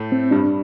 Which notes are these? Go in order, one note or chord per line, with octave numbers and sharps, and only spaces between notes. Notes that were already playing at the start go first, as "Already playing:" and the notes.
Already playing: A2 A3
C4
G2 G3 D4